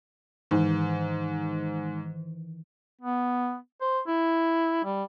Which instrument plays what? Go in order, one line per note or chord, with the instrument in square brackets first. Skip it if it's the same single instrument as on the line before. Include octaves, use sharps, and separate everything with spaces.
[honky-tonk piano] G#2 [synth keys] D#3 E3
[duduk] B3
C5
E4
G3